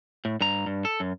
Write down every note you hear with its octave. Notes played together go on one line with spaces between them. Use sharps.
A2
G2 A#5
G2
A4
F#2